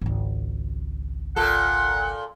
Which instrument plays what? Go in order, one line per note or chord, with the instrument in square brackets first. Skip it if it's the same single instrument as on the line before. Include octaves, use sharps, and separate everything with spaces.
[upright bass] G#1 C#2
[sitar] A#2 A4 [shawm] F#5